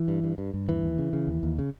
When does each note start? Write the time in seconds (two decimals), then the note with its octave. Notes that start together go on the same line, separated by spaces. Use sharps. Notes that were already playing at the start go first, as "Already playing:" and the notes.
Already playing: E3
0.08 G2
0.24 G2
0.38 G2
0.54 G2
0.68 D#2 E3
0.83 D#2
0.98 C#3
1.13 C#3
1.28 D#2
1.43 D#2
1.59 C#3